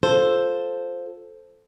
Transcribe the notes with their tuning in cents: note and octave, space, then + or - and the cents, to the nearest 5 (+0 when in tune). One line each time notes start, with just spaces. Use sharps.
F4 +15 A4 +0 C5 +0